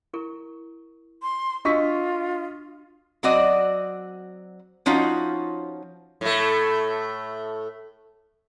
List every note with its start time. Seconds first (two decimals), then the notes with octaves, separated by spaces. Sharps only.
0.13 E4 A#4 C#6
1.22 C6
1.65 D4 F4 F#4 D#5 C#6 E6 B6
3.23 F#3 C4 F#4 D5 D#5
4.86 F3 C#4 D#4 F4 F#4
6.21 A2 A3